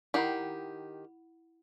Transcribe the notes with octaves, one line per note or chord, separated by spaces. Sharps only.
D#3 E4 G4 F#5 B5